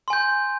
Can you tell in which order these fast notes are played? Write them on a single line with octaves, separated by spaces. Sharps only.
C6 G#5 G6